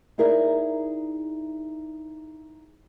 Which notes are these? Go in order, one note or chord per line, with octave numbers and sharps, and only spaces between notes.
D#4 E4 G#4 A#4 D5 E5